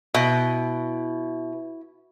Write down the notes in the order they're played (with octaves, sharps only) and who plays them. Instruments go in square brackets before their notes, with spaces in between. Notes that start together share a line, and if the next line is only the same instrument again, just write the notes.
[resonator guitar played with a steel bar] B2 [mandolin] E4